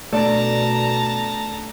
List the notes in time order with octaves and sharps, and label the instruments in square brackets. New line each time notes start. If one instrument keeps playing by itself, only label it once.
[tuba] B2 [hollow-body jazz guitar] A3 D4 [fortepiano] D5 [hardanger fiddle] A5 A#5